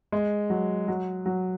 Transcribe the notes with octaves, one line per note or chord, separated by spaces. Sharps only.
G#3
F#3
F#3
F#3